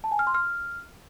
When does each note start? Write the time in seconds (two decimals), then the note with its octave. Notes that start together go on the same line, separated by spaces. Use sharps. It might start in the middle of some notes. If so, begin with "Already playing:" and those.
0.04 A5
0.11 G#5
0.19 F6
0.27 C6
0.34 F6